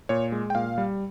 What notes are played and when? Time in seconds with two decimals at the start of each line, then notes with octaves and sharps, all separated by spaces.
0.09 A#2 C#5
0.32 G#3
0.50 G5
0.55 A#2 F5
0.78 G3